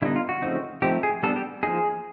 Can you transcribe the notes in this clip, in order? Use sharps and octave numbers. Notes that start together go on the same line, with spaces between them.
D3 G3 B3 D#4 E4
F4
F#4
C#3 F3 A3 C4 D#4
F3 A3 C4 D#4 G4
G#4
G3 B3 D4 A4
G4
F3 A#3 D#4 G#4